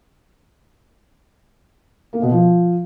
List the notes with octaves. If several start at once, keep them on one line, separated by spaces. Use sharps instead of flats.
A#3
B2
F3